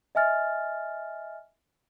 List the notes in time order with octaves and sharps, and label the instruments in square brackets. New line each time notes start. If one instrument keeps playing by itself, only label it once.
[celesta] D#5 E5 G#5 F6 A6